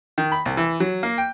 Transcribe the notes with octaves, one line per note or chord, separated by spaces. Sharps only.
D#3
B5
C2
E3
F#3
A#3
G5